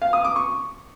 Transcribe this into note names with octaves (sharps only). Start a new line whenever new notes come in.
F5
D#6
D6
C#6